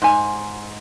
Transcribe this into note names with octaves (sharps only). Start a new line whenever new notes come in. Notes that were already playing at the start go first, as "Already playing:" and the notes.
G#2 G#5